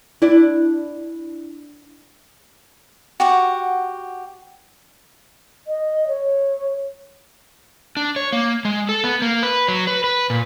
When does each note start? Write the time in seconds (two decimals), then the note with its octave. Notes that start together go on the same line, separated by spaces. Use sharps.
0.22 D4 E4
3.20 F#4 G4 F#5
5.67 D#5
6.07 C#5
7.97 D4
8.16 C#5
8.32 A#3
8.65 G#3
8.89 A4
9.04 B3
9.22 A#3
9.43 B4
9.68 F#3
9.87 B4
10.04 B4
10.30 A#2